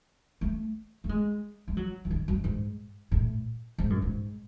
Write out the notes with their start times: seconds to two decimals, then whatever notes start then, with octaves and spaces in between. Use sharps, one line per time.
0.41 A3
1.04 A3
1.09 G#3
1.68 G#3
1.77 F#3
2.05 E3
2.11 D#3
2.28 F#2
2.44 G#2
3.12 A2
3.78 G#2
3.90 F#2
4.02 G#2